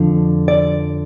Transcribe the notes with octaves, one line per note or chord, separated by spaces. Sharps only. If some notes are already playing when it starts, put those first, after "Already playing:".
Already playing: F2 D3 F3
D5